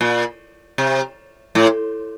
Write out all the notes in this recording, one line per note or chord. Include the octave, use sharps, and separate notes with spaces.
A#2
C3
A2